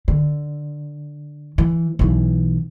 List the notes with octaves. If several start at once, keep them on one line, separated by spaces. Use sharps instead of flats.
D3
E3
B1 E3